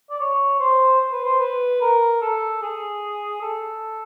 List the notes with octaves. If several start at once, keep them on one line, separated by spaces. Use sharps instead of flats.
D5
C#5
C5
C5
B4
C5
B4
A#4
A4
G#4
A4